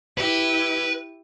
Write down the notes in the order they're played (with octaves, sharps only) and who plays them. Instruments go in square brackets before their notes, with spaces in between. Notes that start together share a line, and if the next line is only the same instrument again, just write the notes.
[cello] E4 G4 [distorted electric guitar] B4